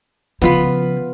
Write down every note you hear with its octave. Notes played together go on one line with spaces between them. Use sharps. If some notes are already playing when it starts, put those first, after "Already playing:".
C#3 F3 B3 F4 B5